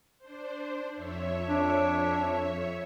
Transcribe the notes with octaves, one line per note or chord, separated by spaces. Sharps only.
D4 C5
F2 C#5 E5
D4